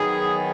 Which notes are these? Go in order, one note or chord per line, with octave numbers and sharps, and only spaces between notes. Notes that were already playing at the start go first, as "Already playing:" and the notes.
Already playing: D#3 F#3 B3 D#4 G#4